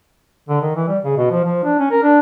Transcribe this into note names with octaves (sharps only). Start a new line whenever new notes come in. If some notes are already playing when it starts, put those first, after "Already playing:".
D3
D#3
E3
G3
C#3
B2
F3
F3
D4
C#4
A#4
D4